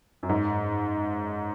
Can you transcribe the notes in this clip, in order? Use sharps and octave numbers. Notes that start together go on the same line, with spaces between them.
F#2
G#2